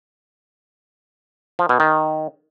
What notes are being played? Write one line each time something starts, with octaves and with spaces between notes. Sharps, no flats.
F3
B2
D#3